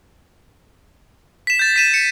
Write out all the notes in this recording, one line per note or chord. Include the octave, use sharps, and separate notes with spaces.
B6 E7
G6 A6
B6 D#7 E7
C#7